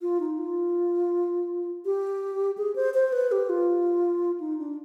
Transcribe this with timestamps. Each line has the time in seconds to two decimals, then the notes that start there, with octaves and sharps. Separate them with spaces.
0.02 F4
0.20 D#4
0.38 F4
1.85 G4
2.58 G#4
2.76 C5
2.94 C5
3.12 B4
3.32 G4
3.49 F4
4.40 D#4
4.59 D4